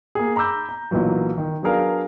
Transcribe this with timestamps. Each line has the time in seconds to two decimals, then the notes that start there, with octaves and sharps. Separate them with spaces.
0.15 A#3 G#4
0.36 A#5 B5 D6 E6 G6
0.69 A#5
0.91 B1 A#2 E3 F#3
1.38 D#3
1.62 F#3 B3 D4 G#4 A#4 F5